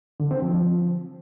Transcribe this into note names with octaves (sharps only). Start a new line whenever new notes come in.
D3
C4
F3
F3